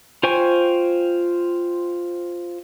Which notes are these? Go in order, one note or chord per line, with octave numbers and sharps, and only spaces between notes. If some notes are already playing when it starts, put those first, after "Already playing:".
F4 C5 G5 G#5 C#6